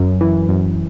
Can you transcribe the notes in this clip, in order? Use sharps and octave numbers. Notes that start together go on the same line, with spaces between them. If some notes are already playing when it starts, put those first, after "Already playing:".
Already playing: F#2
E3
F#2